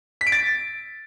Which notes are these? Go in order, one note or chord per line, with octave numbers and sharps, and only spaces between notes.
B6
D7
A6